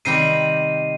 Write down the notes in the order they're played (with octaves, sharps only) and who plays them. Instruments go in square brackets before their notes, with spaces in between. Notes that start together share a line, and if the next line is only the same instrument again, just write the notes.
[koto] C3 D#3 G3 C4 [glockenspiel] C7 D#7